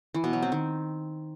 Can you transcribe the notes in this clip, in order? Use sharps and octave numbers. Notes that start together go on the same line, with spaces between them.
E3
B2
F#3
C4
D#3